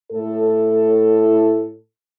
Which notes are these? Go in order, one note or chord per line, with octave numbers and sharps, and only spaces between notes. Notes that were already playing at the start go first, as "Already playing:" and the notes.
A2 A4